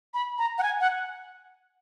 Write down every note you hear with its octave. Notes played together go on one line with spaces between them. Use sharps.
B5
A#5
F#5
G#5
F#5